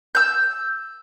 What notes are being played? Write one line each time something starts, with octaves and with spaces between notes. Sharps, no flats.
E6 G6